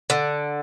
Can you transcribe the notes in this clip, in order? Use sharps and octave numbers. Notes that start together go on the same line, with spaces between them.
D3